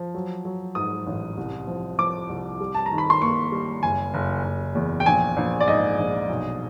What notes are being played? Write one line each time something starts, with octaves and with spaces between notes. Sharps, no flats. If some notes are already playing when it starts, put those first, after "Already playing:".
Already playing: F3
F#3
F#3
G#2 D#6
A1
C2
F3
F3 D6
C2
G3
A5
A#5
D#3
B5
C6
A#3 C#6
G3
F#1 G#5
F#1
F#1
E2
G5
A#1 G#5
A#1
D5
G#2 D#5
A#1
B1